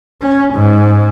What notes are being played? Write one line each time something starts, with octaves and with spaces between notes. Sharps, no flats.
C#4
G#2